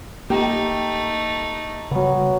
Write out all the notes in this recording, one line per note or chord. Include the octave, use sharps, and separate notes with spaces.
A3 A#3 D#4 G4
C#3 F#3 G3 B3